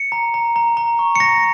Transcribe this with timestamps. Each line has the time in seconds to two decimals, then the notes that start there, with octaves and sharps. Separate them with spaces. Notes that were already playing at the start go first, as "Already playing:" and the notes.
Already playing: C#7
0.12 A#5
0.34 A#5
0.56 A#5
0.77 A#5
0.99 C#6
1.16 C#7
1.20 A#5 A#6